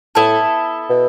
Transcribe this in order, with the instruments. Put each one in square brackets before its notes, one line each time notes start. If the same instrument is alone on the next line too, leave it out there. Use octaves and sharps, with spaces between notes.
[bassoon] A2 [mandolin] B3 E4 A4
[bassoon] B2